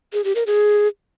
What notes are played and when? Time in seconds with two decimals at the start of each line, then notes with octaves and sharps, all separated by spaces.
0.13 G#4
0.24 G4
0.35 A#4
0.47 G#4